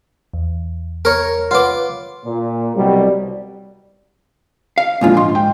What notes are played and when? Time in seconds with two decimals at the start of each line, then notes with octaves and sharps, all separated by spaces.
0.34 E2
1.05 A#4 C#5
1.51 F4 B4 C#5 F#5 D6
2.26 A#2
2.76 C2 B2 F#3 G3
4.78 F5
5.01 D2 A#2 D3 F3 G#3 F4
5.17 G#2 C6
5.35 G5